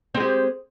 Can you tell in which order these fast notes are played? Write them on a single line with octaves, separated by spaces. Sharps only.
C4 G#3 G4